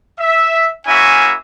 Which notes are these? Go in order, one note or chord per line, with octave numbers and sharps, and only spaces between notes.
E5
A#3 C#4 E4 F#4 E5 G#5